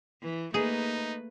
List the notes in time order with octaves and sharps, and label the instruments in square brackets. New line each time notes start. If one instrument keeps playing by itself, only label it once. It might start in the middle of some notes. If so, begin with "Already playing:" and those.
[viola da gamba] E3
[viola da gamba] A3 A#3 B4 [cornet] D#4 [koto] G#4